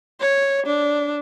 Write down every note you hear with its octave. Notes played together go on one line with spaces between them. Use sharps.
C#5
D4